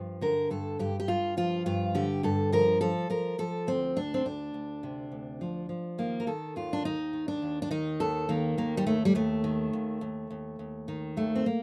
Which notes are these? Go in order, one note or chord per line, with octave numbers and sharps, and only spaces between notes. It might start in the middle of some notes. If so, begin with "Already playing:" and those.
Already playing: G2 F3
D3 A#4
G2 A4
G2 G4
G4
G2 F4
F3 F4
G2 F4
D3 G4
G2 A4
F3 A#4
F3 A4
F3 A#4
F3 A4
D2 C4
D2 D4
C4
D2 D4
D2
C3
D2
F3
F3
D#3 A#3
A#4
D#3 A4
D#2 F4
D4
D#2 D#4
D#3
D4
D#2
D4
D#3 D#4
D#2 A4
D#3 A#3
D#2 A#3
G3
D#2 A3
G3
D#2 A3
D#3
D#2
D#2
D#2
D#2
D#3
D#2 A3
C4
A#3